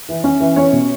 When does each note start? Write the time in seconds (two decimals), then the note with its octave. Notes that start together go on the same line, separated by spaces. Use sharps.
0.09 E3
0.24 C#4
0.40 E3
0.56 C#4 C#5
0.73 B2